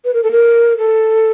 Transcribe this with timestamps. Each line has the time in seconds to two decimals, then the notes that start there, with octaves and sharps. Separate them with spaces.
0.05 B4
0.14 A#4
0.23 A4
0.31 A#4
0.78 A4